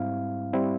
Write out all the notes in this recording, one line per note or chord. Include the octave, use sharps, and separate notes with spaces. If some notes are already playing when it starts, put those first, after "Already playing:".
Already playing: G#2 G3 C4 E4 F5
G3 C4 E4